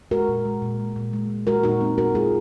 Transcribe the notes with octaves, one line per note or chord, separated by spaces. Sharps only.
G#3 F#4 A#4
A#2
G#3
A#2
G#3
A#2
G#3
A#2
G#3 F#4 A#4
A#2 D#4 F#4
G#3 C4
A#2 F#4 A#4
G#3 F4 G#4